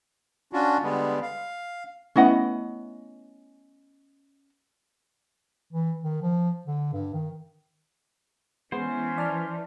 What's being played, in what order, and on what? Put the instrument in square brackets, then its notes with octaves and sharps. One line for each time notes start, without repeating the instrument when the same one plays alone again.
[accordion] C#4 D4 F4 F#4
D3 G3 G#3 B3
F5
[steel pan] A3 B3 E4 [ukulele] C#4 D#5 F#5
[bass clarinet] E3
D#3
F3
D3
G2
D#3
[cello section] E3 [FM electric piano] G#3 B3 [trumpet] C#4 [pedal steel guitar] C5
[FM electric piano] D5 A5 F6